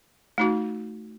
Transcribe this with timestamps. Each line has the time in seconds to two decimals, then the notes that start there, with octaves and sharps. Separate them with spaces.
0.38 A3 D#4 F#4